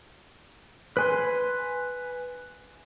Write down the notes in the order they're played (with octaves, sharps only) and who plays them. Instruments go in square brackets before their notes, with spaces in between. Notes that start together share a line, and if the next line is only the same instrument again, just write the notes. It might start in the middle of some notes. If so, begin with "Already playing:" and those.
[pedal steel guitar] B4 G#5 C6